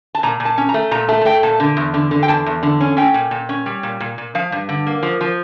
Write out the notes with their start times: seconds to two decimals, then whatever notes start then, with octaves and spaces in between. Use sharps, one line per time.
0.15 A5
0.23 A#2 A#5
0.40 A#2
0.45 A5
0.58 C#4
0.69 A#5
0.74 A3
0.91 A#2 A#5
1.08 A3 A5
1.21 A5
1.25 A3 G5
1.43 A#2 A5
1.60 D3
1.77 E2
1.94 D3
2.11 D3
2.23 G5
2.28 E2 A5
2.46 E2
2.63 D3
2.80 C#4
2.97 C#4 G5
3.14 A#2
3.31 A#2
3.49 C#4
3.66 G3
3.83 A#2
4.00 A#2
4.18 A#2
4.35 F3 F5
4.52 G2
4.69 D3
4.87 A#3
5.03 F3
5.21 F3